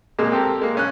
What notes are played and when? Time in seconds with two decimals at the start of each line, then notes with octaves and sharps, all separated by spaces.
0.19 F2 A#2 G#3 A#3
0.32 C4 G4 A4 A#4
0.61 G#3 A#3
0.75 B1 C#4 F#6